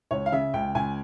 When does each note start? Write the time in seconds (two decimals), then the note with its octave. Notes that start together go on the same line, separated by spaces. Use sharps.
0.11 C#2 C#5
0.26 F5
0.32 C#3 E5
0.54 C#2 G5
0.75 C#2 G#5